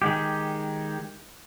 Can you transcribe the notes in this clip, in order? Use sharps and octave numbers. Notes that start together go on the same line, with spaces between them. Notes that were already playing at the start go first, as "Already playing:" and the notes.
D#3 G#3 G4